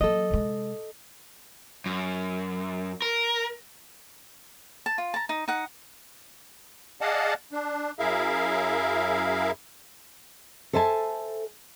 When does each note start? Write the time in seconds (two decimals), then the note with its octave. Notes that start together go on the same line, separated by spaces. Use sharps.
0.01 F#3 A#3 A4 D#5
0.31 C3 G#3
1.86 F#2
3.02 A#4
4.86 A5
4.98 F4
5.14 A5 A#5
5.29 D#4
5.48 D#4 F#5
7.01 G#4 D5 D#5 F5 F#5 A5
7.52 D4
7.99 F#2 E4 G#4 A#4 E5 F5
10.73 A4 C5 E5 G#5 A5